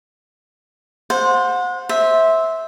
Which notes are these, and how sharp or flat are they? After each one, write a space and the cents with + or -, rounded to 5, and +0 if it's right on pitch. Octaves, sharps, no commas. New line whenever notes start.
C5 +0 F#5 -35
C5 +0 E5 -15